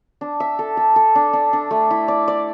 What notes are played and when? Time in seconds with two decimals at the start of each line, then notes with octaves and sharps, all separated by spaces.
0.21 D4
0.40 E5
0.59 A4
0.77 A4
0.96 A4
1.15 D4
1.33 D4
1.53 D4
1.71 A3
1.91 E4
2.08 D5
2.28 D5